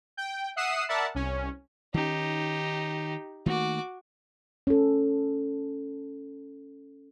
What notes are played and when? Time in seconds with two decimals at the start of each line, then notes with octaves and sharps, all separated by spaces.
0.17 G5
0.56 E5 F#5 D#6 C7 D#7 E7
0.89 A#4 D5 E5 F#5 A5 B5
1.15 C2 C#4
1.94 D#3 C#4 D#4 G4
3.46 D#3 A3 A#3 F#4 D6
4.67 C#4 A4